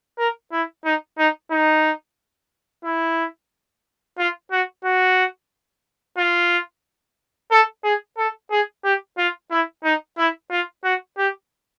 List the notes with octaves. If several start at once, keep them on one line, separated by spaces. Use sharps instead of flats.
A#4
E4
D#4
D#4
D#4
E4
F4
F#4
F#4
F4
A4
G#4
A4
G#4
G4
F4
E4
D#4
E4
F4
F#4
G4